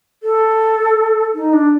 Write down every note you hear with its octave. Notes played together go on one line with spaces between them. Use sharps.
A4
D#4
D4